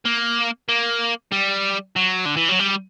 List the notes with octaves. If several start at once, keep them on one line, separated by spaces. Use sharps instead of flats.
A#3
A#3
G3
F#3
D3
E3
F#3
G3